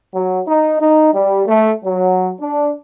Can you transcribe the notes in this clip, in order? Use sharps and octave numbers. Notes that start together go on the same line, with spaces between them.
F#3
D#4
D#4
G3
A3
F#3
D4